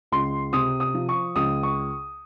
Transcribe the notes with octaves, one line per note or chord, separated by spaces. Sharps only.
C#2 C6
C3 D#6
D#6
F3
C#6
C#2 D#6
C#6